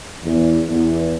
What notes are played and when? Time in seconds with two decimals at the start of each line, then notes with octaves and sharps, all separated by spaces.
0.24 E2
0.69 E2